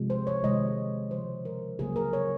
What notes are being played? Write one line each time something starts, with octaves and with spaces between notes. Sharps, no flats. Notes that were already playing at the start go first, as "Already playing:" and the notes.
Already playing: C3 F3 G#3
C5
C#5
C3 D#3 G#3 D#5
C#3 F3 G#3 C5
A#4
C#3 F#3 A#3 G#4
A#4
C#5